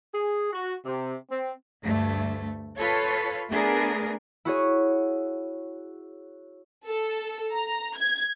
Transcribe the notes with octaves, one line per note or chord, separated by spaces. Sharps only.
G#4
F#4
C3
C4
D2 G2 A3
F4 A4 B4 C#5 F5
A3 B3 D4 G#4 A#4
E4 F#4 G#4 C#5
A4
A#5
G#6